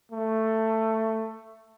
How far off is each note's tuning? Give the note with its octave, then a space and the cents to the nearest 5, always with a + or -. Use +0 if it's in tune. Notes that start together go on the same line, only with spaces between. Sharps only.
A3 +10